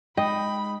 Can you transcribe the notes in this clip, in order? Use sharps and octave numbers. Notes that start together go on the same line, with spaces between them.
G#3 D#4 D#5 G5 B5